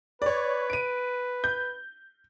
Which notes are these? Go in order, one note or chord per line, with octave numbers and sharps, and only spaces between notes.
B4 C#5 D5
D7 D#7
G6